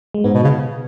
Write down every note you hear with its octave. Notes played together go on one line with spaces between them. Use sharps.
G#3
G#2 B3
B2
C#3